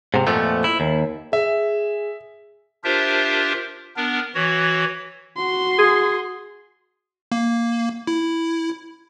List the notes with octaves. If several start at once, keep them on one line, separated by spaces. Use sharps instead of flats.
G#2 C3
F2 A#2 F3 A3 B3
E4
D#2
G#4 E5
D4 F4 G4 A#4 C5 E5
B3 D4 A#4
E3 F#4 C#5
F#4 C6
G#4
A#3
E4